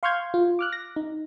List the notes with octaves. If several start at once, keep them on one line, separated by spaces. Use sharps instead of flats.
F5 C6 C#6 F6 G6 G#6
F4
D6 F6 F#6
A#6
D#4